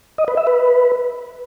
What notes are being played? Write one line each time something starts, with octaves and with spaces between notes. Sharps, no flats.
D#5
B4
E5
B4